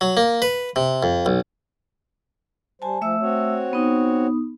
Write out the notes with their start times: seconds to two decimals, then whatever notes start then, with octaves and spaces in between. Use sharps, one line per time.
0.01 F#3
0.17 A#3
0.42 B4
0.76 C3
1.03 F2
1.26 B1
2.82 G3 C5 G#5 A5
3.01 F3 A3 E5 E6
3.21 C4 F#4 C#5
3.73 B3 D#4